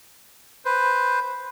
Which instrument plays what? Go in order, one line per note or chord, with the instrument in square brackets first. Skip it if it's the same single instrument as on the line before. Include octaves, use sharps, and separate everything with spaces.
[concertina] B4 C5